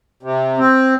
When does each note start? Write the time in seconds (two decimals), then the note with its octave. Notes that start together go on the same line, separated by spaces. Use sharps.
0.23 C3
0.58 C4